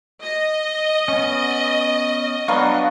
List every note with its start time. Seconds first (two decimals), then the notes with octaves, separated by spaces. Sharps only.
0.24 D#5
1.08 B3 C#4
2.48 F#3 B3 D4 F5 C#6